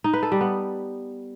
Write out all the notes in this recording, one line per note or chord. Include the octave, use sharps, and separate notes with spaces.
D#4
B4
A4
G3
B3